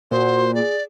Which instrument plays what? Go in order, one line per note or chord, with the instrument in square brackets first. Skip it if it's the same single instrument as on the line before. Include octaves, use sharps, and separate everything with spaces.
[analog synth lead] A#2 [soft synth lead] F#4 [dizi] C5
[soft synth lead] G#4 [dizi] D5